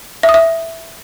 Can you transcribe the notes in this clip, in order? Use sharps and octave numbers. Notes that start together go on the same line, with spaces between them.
E5
D#6
E5